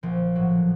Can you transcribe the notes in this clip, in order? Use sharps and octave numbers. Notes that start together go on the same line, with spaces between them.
A#1 F3
A2 F#3